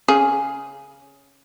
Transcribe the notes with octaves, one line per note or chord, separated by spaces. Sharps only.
C#3 G#4